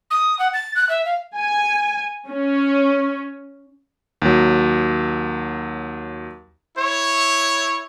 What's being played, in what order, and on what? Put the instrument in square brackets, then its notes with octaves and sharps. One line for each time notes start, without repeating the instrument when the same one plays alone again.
[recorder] D#6
F#5
A6
F#6
E5
F5
[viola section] G#5
C#4
[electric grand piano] D#2 F#3
[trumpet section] E4 C#5